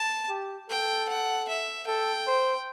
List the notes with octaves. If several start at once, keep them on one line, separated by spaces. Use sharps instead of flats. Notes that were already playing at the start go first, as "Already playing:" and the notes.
Already playing: A5
G4
A4 G5
F#5
E5
A4 G5
C5